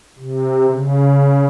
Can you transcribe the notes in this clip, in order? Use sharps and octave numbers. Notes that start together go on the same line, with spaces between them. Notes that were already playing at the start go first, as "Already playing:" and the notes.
C3
C#3